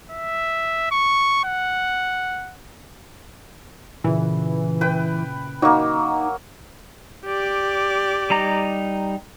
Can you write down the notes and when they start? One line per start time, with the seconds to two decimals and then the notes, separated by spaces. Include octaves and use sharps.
0.11 E5
0.91 C#6
1.44 F#5
4.04 A#2 C#3 E3
4.81 B4 G5
5.62 F#3 A#3 D#4
7.26 G4 D5
8.30 G3 D#4 A#5